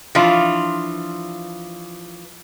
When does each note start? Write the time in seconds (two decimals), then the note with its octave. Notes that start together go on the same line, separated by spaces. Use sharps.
0.15 E3 F3 D4 F4